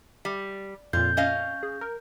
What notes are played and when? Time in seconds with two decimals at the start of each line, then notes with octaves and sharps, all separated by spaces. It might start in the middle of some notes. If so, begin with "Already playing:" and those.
0.25 G3
0.93 F2 A#2 F4 G6
1.17 C#4 D#5 F5
1.63 G#4
1.81 A#4